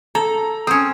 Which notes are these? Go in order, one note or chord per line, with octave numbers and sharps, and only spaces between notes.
A4 A#5
C4 C#4 D#6